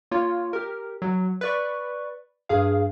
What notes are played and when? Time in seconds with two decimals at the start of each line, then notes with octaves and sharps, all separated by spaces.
0.11 A#3 F4 C#5
0.53 G4 A#4
1.02 F#3
1.41 B4 D5 C#6
2.49 G2 G#4 F5